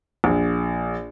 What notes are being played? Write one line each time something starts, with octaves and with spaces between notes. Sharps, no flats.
A#1